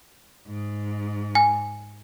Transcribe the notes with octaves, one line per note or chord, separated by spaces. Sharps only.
G#2
G#5